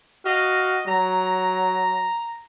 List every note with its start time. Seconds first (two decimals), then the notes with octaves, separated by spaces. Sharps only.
0.25 F#4 D#5 F5
0.87 F#3 A#5